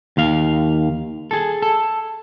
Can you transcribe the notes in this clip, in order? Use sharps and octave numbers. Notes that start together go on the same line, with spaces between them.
D#2 F5
G#4 A4
A4